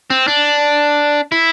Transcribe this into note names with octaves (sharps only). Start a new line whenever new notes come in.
C4
D4
E4